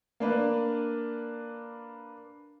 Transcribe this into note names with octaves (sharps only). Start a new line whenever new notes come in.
A#3 D4 B4